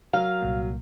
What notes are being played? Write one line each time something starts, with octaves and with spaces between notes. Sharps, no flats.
F#3 A#4 F5
C2 A#2 A#3